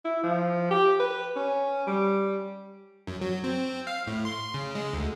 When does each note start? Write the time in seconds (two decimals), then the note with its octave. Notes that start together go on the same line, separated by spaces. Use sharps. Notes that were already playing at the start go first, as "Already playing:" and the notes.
0.05 E4
0.23 F3
0.71 G4
1.00 B4
1.36 C#4
1.87 G3
3.07 F#2
3.22 F#3
3.44 C4
3.87 F5
4.07 A2
4.25 C6
4.54 C#3
4.75 G#3
4.93 D2